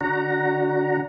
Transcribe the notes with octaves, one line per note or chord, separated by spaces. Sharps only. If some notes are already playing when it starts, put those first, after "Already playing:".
D3 D4 F#4 F#5 A#5